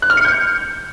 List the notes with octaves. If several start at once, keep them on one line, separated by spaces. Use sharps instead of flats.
F#6
F6
C#7
G6